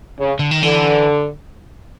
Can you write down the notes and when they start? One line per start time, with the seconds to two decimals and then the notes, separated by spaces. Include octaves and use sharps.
0.19 C#3
0.39 D3
0.51 D#3
0.62 D3 E3